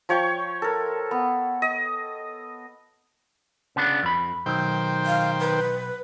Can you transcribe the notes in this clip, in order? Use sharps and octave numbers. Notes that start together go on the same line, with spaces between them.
F3 C#5 G5 C#6
A4 A#4
B3
D#5
C#3 B3 D4
F2 B5
B1 D#3 C5 G5
F5
B4